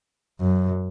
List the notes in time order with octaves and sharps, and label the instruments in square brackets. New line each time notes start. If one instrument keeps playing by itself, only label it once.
[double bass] F#2